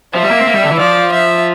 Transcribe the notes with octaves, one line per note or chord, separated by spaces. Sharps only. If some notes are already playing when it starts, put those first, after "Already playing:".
F3 E5
G3
A#3
C4
A#3
G3
D3
E3
F3 D5
E5